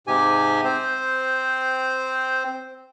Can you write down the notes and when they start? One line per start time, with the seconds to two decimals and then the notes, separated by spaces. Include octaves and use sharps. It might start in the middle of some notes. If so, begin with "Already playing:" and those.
0.07 G#2 C3 G4 G#5
0.64 C4 C5